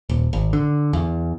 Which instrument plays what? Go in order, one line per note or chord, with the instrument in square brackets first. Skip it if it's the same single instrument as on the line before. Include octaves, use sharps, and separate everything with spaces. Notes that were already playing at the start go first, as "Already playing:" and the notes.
[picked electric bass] D#1
G#1
D3
E2